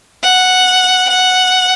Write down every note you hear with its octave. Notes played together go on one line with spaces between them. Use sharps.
F#5
F#5